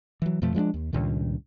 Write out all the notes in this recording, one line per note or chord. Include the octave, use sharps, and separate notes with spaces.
E3 F#3
F2 B2 F3 A3
F3 G#3 B3 D4
D#2
C#2 G2 A#2 D#3